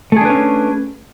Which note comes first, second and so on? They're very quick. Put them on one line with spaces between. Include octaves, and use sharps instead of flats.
A3 G#4 D4 B4 C#4